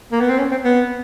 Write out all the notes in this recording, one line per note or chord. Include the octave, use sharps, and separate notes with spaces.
A#3
B3
C4
C#4
C4
B3